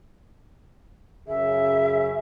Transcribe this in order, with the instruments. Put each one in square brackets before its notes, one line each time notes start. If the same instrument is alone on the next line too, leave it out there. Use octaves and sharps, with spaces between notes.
[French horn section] F#2 C#3 G#4 [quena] E5